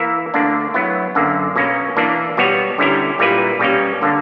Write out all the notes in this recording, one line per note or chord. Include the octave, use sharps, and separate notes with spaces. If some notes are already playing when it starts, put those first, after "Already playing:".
Already playing: E3 A#3 E4 A#4 E5
D2 D3 A#3 D4
F#3 B3 E4
F#2 D3 A#3
B2 A#3 C#4
E3 A#3 D4
B2 G3 B3 F#4 C#5
D3 G3 C#4 E4 A#4
A#2 G3 A#3 E4 B4
B2 G3 A#3 C#4
D3 A#3 D4